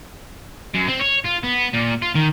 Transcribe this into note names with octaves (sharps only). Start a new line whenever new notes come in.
F#2
C4
C#5
F4
B3
A#2
F4
D#3